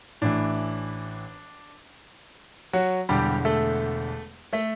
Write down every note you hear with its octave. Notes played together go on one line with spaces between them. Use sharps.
A1 A2 E3 D4
F#3 F#4
E1 E2 D3 G3 G4
A3 A4
A3 A4